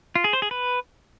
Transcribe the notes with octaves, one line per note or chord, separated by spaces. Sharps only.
F4
G#4
C5
G#4
B4